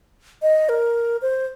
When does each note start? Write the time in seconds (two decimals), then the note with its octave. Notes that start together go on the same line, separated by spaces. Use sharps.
0.42 D#5
0.69 A#4
1.22 C5